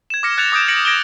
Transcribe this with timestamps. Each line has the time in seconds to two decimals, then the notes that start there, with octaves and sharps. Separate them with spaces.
0.10 G#6 E7
0.23 D6 F6 A#6 C#7
0.38 F#6 G#6 A6 C#7 E7 F7
0.52 D6 D#6 G6 D7 E7
0.68 A#6 C#7 D7 F#7
0.85 G#6 A#6 D7 E7 G7